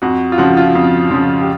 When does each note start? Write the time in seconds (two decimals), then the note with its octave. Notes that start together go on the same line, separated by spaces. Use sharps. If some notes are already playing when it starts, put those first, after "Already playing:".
0.02 F2 F#4
0.32 F4
0.38 C#3 F3 F#4
0.57 F4
0.75 F2
1.11 C#3 F3
1.41 G4